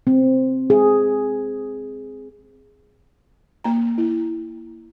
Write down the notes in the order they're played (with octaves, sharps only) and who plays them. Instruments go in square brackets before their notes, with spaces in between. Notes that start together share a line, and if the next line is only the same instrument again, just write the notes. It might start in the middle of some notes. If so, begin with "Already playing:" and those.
[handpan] C4
G#4
[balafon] A#3 A#5
E4